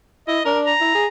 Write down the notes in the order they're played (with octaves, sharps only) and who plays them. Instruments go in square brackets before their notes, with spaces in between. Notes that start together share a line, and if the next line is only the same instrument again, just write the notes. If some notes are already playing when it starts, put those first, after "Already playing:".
[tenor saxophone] E4 [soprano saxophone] D#5
[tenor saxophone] D4 [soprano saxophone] A#4
[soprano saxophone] A#5
[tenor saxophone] E4
G#4